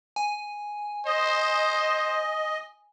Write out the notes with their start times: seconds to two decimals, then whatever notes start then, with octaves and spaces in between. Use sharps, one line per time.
0.16 G#5
1.06 C5 D#5